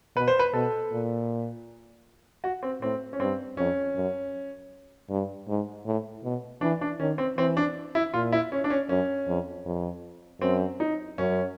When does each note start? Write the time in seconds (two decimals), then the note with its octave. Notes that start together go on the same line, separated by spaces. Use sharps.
0.16 B2 B4
0.28 C5
0.39 B4
0.53 B2 A4
0.92 A#2
2.44 F#4
2.63 C4
2.81 A2 C4
3.13 C#4
3.20 G2 C4
3.57 F2 C#4
3.96 F#2
5.10 G2
5.48 G#2
5.85 A2
6.24 B2
6.61 E3 D4
6.81 D4
7.00 D#3 C#4
7.18 C4
7.37 E3 C4
7.57 D4
7.95 E4
8.14 A#2 F4
8.32 E4
8.52 C#4
8.64 D4
8.70 C#4
8.89 F#2 C#4
9.27 F2
9.66 F2
10.41 F#2 C4
10.80 D#4
11.18 F#2 C#4